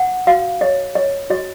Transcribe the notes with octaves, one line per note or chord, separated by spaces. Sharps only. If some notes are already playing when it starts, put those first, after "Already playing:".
Already playing: F#5
F#4 F5
C#5 D#5
C#5 D#5
F#4 D#5